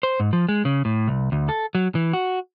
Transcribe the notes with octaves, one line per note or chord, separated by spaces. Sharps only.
C5
G#2
F3
G#3
C#3
A2
C2
D2
A4
F#3
E3
F#4